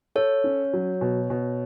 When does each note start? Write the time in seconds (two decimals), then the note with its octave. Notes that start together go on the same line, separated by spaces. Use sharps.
0.15 A4 C#5
0.44 C#4
0.73 F#3
1.01 B2
1.30 B2